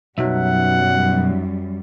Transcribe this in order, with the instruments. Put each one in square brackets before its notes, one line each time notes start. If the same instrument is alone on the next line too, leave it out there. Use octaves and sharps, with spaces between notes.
[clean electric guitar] B1 [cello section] F#2 G3 [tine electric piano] F#3 D#4 E5 [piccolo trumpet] F#5